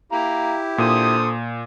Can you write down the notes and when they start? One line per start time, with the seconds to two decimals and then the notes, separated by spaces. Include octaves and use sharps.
0.12 E4 G4 F5 A#5
0.78 A#2 D3 A4 C5 D#6